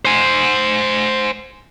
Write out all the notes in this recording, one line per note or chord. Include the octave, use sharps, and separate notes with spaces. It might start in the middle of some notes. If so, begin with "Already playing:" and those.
C5 G#5